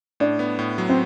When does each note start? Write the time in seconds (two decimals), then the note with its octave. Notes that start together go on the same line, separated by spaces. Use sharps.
0.20 A2 D4
0.39 B3
0.59 A2
0.78 F#3
0.89 C4